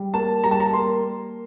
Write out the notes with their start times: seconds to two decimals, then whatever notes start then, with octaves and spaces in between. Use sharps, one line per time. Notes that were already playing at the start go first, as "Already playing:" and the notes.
Already playing: G3
0.14 A#3 A5
0.44 G3 A#5
0.51 A5
0.60 A#5
0.73 A#3 C6
1.03 A#3